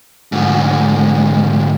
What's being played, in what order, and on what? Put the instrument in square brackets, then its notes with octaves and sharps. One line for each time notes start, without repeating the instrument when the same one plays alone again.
[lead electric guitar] D2 G#2